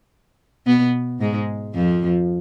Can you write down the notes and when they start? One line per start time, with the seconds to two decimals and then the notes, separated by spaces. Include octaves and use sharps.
0.66 B2 B3
1.20 G#2 G#3
1.74 F2 F3